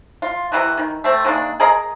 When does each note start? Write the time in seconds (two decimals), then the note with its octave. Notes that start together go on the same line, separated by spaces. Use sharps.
0.22 F4
0.52 C3 E3 A#3 F#4
0.78 D#3
1.04 A3 C4
1.25 D#3 G#3 A#3 D4
1.60 G#4 A#4 D#5 A#5